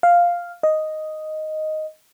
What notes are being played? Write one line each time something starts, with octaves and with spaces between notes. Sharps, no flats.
F5
D#5